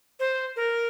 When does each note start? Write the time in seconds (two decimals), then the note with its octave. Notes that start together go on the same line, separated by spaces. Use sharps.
0.20 C5
0.56 A#4